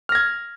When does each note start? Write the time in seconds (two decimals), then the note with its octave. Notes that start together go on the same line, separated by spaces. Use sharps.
0.09 F6
0.12 A#6
0.15 G#6